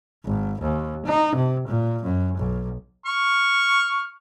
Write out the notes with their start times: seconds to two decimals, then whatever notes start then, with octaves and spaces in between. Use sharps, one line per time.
0.25 G#1
0.61 D#2
1.06 D#4
1.35 C3
1.68 A#2
2.03 F#2
2.37 B1
3.06 C#6 F6